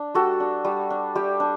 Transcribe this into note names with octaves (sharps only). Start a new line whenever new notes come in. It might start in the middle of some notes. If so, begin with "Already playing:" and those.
Already playing: D4
G3 F#4 A4
D4
G3
D4
G3 G4
D4